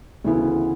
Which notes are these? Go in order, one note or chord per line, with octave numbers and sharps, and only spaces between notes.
D2 C#3 E3 B3 E4